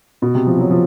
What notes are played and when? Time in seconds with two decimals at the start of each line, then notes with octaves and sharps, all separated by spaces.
0.22 B2
0.35 C3
0.47 F3
0.59 F#3
0.71 F3